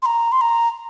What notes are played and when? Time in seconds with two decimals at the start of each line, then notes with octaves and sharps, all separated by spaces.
0.02 C6
0.06 A#5
0.32 C6
0.41 A#5